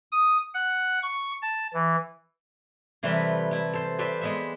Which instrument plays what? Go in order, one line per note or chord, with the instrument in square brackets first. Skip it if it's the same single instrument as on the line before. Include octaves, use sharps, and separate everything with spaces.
[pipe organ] D#6
F#5
C#6
A5
E3
[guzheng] C3 E3 G3 A3 A#4 B4
A3 E4
A4 C5
G4 A4 B4 C5 D5 E5
G#3 B3 E5